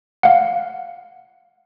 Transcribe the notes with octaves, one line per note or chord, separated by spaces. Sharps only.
F5 F#5